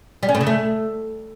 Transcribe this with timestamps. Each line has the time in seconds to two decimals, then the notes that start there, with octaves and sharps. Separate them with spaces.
0.23 G3
0.29 C#4
0.35 A2
0.41 C#3
0.47 A3